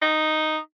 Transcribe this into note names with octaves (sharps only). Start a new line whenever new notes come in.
D#4